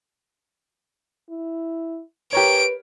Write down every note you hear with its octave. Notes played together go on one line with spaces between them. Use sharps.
E4
G4 A#4 B4 C#5 D7